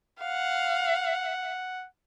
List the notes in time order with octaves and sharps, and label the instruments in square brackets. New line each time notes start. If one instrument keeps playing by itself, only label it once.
[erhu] F5 [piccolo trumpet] F#5